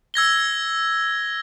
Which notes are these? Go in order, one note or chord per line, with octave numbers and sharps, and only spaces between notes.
E6 G#6 A#6 G7